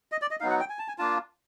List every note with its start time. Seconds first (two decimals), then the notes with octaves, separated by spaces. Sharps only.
0.12 D#5
0.22 D5
0.31 D#5
0.40 F#3 B3 D#4 F5
0.50 F#5
0.60 G5
0.69 G#5
0.79 A5
0.88 G#5
0.98 A#3 D4 F4 A5